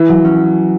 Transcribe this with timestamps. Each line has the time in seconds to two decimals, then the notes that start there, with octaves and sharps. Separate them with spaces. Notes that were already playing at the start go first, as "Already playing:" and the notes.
Already playing: E3
0.09 F#3
0.25 C#4